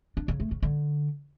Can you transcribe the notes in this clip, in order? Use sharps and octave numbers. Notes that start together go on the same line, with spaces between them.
D4
C#3
A3
C#3
D3